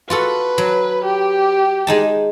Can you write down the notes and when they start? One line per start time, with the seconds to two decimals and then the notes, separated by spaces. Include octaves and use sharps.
0.10 F4 F#4 A4 B4
0.58 F#3
1.05 G4
1.87 G#3 D#4 A5